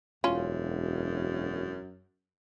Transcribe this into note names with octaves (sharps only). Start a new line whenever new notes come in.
E1 F#2 C#4 F4